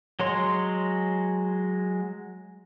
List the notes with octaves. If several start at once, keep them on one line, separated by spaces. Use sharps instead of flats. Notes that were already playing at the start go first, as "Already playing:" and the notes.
F#3 G#3 C#5 C6